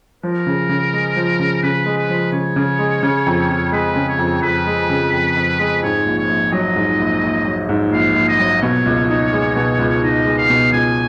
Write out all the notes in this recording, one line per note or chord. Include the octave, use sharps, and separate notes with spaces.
F3 A#4
C#3
C#3
G#3
F3
C#3
C#3 B4
G#3
B4
F3
C#3 C#5
C#3
G#3
C#3
F2
F2
G#3 B4
C#3
C#5
F2
F2 B4
G#3
C#3
F2
F2
G#3
G#2 C#5
A#1
C#5
A#1
F#3 D#5
G#2
A#1
A#1
F#3
G#2
A#1 F5
A#1
D#5
F#3
B2 C#5
C#2
D#4
G#3
B2
C#2
D#4 D#5
G#3
F5
B2
C#2 G#5